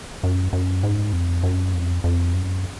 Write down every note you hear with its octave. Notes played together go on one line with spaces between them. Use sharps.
F#2
F#2
G#2
F2
F#2
F2
F2
F#2